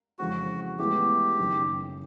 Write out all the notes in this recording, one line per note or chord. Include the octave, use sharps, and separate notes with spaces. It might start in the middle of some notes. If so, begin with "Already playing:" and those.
F2 C#3 E3 G#3 C4 F#4
A2 E3 G#3 B3 E4 G4
F#1 F#2 D#3